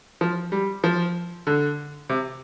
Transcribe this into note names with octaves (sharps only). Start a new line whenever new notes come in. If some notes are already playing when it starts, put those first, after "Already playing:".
F3
G3
F3
D3
C3